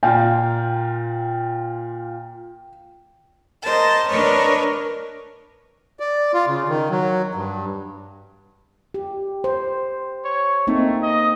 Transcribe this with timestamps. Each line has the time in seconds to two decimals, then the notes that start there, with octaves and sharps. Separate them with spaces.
0.03 A#2 A#3 F4 G5
3.64 A#4 C5 D#5 A5
4.08 D4 A#4 B4 C#5 D#5
6.00 D5
6.34 F4
6.48 C#3
6.69 D#3
6.91 F#3
7.35 G2
8.94 G4
9.44 C5
10.24 C#5
10.67 A3 A#3 C4 D#4
11.02 D#5